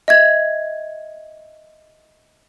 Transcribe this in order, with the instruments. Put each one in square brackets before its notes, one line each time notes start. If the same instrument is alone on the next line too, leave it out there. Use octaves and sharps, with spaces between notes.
[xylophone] D#5 E5 G#6